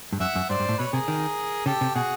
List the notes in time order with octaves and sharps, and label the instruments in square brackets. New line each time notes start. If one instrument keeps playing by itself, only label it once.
[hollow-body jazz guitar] G2
[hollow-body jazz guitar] F#2 [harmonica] E5 F#5
[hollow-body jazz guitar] F#2
[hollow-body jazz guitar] G2 [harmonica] C5 D5
[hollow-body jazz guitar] G2
A2
[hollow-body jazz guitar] B2 [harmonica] B4 C#5
[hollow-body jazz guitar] C3 [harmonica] G#4 A#4
[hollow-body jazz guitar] D#3
[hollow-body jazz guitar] C#3 [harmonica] G4 A4
[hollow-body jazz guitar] C3
[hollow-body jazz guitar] B2 [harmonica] F#4 G#4